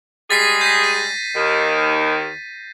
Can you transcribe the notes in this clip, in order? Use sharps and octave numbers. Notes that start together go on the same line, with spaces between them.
G3 G#3 G#4 A6 B6 C7
G6 A#6 B6
D#7
D#2 D#3